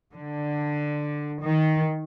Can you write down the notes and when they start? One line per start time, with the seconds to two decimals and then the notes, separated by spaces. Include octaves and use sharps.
0.14 D3
1.43 D#3